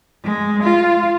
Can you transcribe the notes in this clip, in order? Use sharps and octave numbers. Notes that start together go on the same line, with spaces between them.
G#3
F4